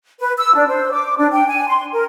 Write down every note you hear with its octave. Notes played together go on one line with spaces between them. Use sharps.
B4
E6
D4
C5
D6
D4
G5
G#5
C6
A#4